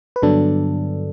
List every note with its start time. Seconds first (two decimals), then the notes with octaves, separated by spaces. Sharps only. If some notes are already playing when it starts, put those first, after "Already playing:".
0.16 B4
0.22 G2 D3 F#3 B3 D4 A4